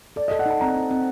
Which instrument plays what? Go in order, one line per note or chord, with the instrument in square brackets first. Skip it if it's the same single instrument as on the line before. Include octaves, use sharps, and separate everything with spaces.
[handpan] A4 [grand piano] D5
[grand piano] D#5
[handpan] A4
[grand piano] F#5
[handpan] D#4 [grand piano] A5
[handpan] C4 [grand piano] A#5
[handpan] D#4
C4